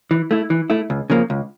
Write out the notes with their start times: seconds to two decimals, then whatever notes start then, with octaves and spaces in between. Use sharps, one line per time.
0.11 E3
0.31 A3 E4
0.50 E3
0.70 A3 E4
0.90 C#2
1.10 C#3 F3 A#3
1.30 C#2